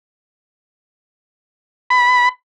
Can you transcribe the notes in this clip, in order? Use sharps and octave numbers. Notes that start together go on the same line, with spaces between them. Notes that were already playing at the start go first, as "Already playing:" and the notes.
B5